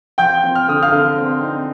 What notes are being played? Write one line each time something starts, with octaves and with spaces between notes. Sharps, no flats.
F3 G5 G6
C4
F6
D3 D#6
F5 F6
D3
C4
D#4